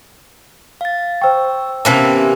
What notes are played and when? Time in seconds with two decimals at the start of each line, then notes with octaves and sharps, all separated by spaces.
0.81 F5 A6
1.21 C5 G5 C#6 E6
1.85 C3 E3 A#3 B3 C#4 A5